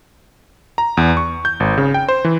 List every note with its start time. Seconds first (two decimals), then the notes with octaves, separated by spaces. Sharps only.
0.78 A#5
0.97 E2
1.17 C#6
1.45 G6
1.60 G#1
1.77 C#3
1.94 G5
2.08 C5
2.25 E3